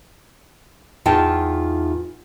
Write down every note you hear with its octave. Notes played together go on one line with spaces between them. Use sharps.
E2 D#4 F4 G5 A5